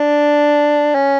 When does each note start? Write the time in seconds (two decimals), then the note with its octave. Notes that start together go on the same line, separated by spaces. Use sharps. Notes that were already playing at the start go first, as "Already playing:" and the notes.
Already playing: D4
0.95 C#4